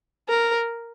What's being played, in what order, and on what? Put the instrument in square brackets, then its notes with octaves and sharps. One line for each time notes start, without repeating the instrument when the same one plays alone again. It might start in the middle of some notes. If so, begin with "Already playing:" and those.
[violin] A#4